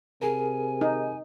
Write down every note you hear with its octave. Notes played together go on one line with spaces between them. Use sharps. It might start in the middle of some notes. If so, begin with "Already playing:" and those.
C3 G#4 A#4 G#5
D#4